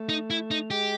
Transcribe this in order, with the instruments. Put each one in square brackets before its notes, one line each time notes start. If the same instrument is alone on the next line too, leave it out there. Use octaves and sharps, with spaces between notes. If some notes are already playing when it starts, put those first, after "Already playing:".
Already playing: [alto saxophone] A3
[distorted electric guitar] D#4
E4
D#4
[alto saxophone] G#3 [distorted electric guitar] G4